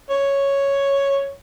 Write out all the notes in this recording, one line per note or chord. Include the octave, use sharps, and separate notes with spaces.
C#5